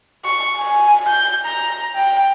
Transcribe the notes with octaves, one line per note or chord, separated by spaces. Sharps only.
C#6
G#5
G6
A#5
G5